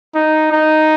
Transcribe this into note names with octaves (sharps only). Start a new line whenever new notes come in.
D#4
D#4